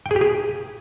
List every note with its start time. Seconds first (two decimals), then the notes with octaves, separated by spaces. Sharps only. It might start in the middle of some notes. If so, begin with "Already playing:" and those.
0.06 G5
0.11 G#4
0.16 G4
0.21 G#4